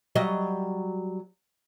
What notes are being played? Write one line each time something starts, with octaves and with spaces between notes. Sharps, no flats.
F#3 G3 D#5